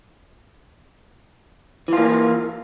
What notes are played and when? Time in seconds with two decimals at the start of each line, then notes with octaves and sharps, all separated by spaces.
1.88 E3
1.93 F4
1.97 A#3